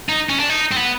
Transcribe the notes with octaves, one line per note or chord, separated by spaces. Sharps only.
D#4
C#4
D4
D#4
C4
B3